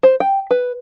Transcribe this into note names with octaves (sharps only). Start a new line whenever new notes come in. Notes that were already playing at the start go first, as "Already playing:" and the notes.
C5
G5
B4